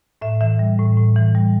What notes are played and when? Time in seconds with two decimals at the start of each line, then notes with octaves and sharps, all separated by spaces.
0.21 A2 E5
0.41 E3 E5
0.59 G3
0.79 A2
0.97 A2
1.16 E3
1.35 G3